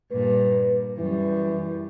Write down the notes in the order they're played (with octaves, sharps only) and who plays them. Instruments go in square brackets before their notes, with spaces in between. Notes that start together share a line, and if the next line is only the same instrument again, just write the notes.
[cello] G2 A#2 [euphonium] B4
[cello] F#2 G3 [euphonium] E3